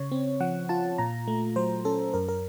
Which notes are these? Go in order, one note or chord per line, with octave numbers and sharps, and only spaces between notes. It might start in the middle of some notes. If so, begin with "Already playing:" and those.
Already playing: C#3 C#5
C4
F3 F#5
F4 A5
A#2 A#5
A3
F#3 C5
C#4 A4
F#2 A#4
A#4